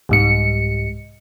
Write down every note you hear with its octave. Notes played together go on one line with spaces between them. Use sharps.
C2 G#2 C#7